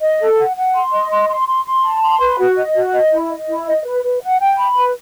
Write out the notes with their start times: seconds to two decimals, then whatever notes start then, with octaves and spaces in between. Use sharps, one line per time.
0.01 D#5
0.19 A4
0.37 F#5
0.56 F#5
0.74 C6
0.92 D#5
1.10 C6
1.29 C6
1.47 C6
1.65 C6
1.83 A5
2.02 C6
2.20 B4
2.38 F#4
2.57 D#5
2.74 F#4
2.93 D#5
3.11 E4
3.30 D#5
3.48 E4
3.66 D#5
3.84 B4
4.03 B4
4.21 F#5
4.39 G5
4.58 B5
4.75 B4